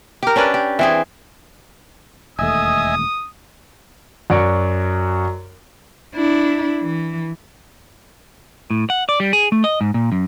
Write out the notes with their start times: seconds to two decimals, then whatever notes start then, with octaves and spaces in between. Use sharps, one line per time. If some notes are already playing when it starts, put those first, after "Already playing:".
0.23 G4 A#4
0.36 C#4 D4 B4 D5
0.54 G4
0.79 E3 C4 G#4
2.39 E1 D#2 A3 D#5 E5 G#5 D#6
4.30 F#2 F#4 D5 C#6 D7
6.15 D4 E4
6.82 E3
8.70 A2
8.90 F#5
9.09 D5
9.20 G3
9.33 G#4
9.52 A3
9.64 D#5
9.81 G#2
9.94 A#2
10.12 F#2